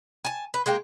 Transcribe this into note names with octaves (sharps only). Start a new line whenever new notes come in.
G#5 A5
B4
G#3 A#3 G4 G5